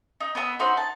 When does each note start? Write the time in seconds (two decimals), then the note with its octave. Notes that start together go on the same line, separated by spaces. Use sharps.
0.20 D#4
0.35 B3 D#5 A5 E6
0.59 D#4 F#4 C5 E5
0.77 A5